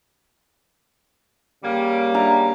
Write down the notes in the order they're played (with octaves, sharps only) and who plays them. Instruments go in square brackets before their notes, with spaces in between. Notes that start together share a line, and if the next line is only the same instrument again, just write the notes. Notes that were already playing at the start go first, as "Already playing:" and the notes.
[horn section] C#3 G3 A#3
[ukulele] D4 E5 A#5